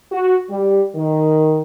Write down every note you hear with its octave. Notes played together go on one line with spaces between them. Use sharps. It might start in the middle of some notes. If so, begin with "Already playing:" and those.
F#4
G3
D#3